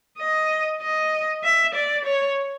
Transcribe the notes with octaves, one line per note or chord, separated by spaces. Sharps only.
D#5
D#5
E5
D5
C#5